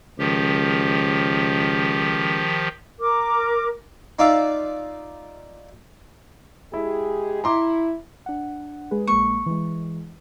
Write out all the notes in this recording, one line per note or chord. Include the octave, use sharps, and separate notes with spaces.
C#2 D#3 F3 G4
A#4 D6
D#4 F4 D5 E5 F5
G#3 E4 G4 G#4
E4 A#5 C6 D6
D4 F#5
G#3 G#4 B4
A#1 G#3 A#3 C#6
E3 G#3